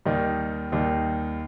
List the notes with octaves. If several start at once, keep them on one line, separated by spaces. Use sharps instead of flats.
D#2 D#3 G3 D#4
D#2 D#3 G3 D#4